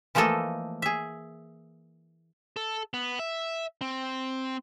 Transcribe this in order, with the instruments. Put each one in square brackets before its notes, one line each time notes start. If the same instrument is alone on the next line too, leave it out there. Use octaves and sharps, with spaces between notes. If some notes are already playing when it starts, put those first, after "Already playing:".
[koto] E3 F3 A3 A#3 A4 D#5
G#4 E5
[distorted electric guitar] A4
B3
E5
C4